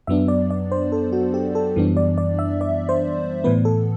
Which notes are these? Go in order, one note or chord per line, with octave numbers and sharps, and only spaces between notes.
F#2 F#3 B3 D4 E5
D5
D5
C5
A4
F#4
G4
A4
F#2 E3 G3 B3 D4
D5
D5
E5
D5
C5
A2 E3 B3 B4
A4